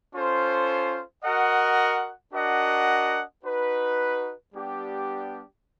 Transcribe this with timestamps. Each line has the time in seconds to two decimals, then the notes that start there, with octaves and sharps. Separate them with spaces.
0.13 C#4 F4 A4 C5
1.23 F#4 A#4 D#5 F#5
2.34 D4 F#4 A#4 D#5 F#5
3.45 D#4 F#4 B4
4.55 G3 B3 D4 G4